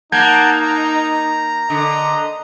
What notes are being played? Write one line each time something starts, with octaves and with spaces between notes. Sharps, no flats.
A#3 D#4 F#5 A5 A#5 G6 G#6
A#5
D3 D#5